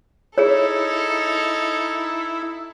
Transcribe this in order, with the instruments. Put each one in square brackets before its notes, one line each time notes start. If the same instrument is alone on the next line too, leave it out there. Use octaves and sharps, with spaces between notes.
[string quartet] D#4 A4 [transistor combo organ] E4 [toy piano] G#4 C#5